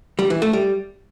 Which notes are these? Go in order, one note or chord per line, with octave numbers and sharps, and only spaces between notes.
G3
E3
A3
G3